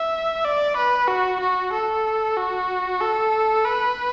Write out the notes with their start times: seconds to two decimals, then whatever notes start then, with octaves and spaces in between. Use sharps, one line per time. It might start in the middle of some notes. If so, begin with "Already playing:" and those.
Already playing: E5
0.45 D5
0.77 B4
1.08 F#4
1.40 F#4
1.73 A4
2.37 F#4
3.01 A4
3.65 B4